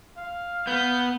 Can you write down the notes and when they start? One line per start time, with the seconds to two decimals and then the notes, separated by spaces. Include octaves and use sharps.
0.17 F5
0.67 B3 G6